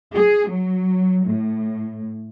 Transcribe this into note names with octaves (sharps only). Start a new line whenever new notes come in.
G#4
F#3
A2